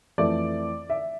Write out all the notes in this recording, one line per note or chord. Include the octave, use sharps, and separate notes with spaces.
F2 E3 A3 D5
E5